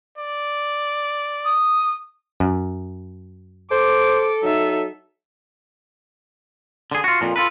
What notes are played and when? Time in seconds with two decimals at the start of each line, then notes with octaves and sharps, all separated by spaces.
0.18 D5
1.45 D#6
2.40 F#2
3.71 A4 C5 D6
4.43 F#3 D#4 E5
6.91 D3 G#4
7.04 F4 F#4
7.21 F2 A#2 F3
7.36 F4 A4 B4